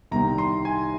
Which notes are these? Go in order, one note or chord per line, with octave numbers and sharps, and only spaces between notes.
C2 C3 D#3 G3 C4 A#5
C6
G#5